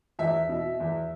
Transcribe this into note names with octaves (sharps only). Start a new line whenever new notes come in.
E2 E5
B2
E2